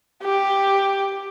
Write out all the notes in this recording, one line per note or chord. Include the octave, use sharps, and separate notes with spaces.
G4